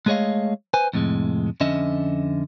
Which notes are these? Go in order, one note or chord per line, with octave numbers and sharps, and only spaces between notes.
G#3 A3 G#4 C#5 D#5 F5
B4 C5 G#5
F2 A2 C3 G#3
F2 D3 C#4 D#5 E5